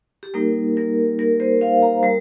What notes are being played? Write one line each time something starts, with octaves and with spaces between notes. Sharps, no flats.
G4
G3 A#3 D#4 A#4
A#4
A#4
C5
F5
A#5
G3 A#4